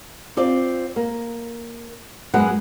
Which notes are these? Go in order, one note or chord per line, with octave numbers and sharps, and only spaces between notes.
C4 F4 D5
A#3
F#2 G#3 B3 F#4 B4 F#5